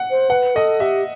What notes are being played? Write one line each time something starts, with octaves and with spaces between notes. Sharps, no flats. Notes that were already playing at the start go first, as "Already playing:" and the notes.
Already playing: F#5
C5
B4 F#5
A4 D#5
G4 E5